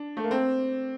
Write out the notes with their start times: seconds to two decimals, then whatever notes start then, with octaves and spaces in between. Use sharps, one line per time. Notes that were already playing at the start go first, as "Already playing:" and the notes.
Already playing: D4
0.17 A3
0.24 A#3
0.31 C4